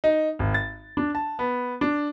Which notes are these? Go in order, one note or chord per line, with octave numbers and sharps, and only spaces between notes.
D#4
G#1
A6
D4
A5
B3
D4